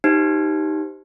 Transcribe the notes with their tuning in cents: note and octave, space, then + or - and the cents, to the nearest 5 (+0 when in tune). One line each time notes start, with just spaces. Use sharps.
D#4 +0 G4 -10 C5 -15